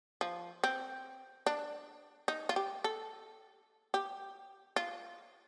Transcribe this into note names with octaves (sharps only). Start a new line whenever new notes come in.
F3
C4
D4
D#4
F4
G4
A4
G4
F4